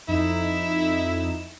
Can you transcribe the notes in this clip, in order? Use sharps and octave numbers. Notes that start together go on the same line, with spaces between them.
F2 D#4 E4 E7